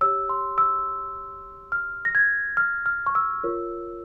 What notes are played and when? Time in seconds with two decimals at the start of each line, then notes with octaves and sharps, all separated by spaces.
0.01 G4 C#5 E6
0.29 C6
0.58 E6
1.72 F6
2.05 A#6
2.15 G#6
2.57 F6
2.86 F6
3.06 C#6
3.15 E6
3.44 F4 A#4 C#5